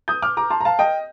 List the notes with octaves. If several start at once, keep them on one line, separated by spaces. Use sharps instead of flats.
D#6 G6
D6 F6
A#5 D6
A5 C6
A#5
F5 A5
D#5 G5